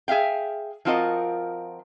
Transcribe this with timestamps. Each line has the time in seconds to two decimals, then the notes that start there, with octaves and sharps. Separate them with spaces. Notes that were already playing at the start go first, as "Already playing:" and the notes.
0.08 G#4 E5 F5 G5
0.85 F3 C4 F4 F#4 A#4 D#5